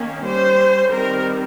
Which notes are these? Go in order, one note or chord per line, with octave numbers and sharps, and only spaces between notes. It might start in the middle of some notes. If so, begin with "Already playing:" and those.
Already playing: D#3 A#3 C#4
G3 C#4 C5
D#3 G3 C4 A#4